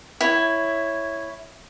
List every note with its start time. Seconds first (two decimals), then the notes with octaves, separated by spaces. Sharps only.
0.21 E4 C#5